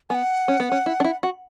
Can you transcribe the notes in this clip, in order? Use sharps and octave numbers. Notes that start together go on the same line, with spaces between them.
B3 F#5 G#5
C#4
B3
C#4
E4
D4
E4
F#4